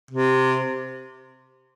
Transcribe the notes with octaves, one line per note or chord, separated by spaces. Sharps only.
C3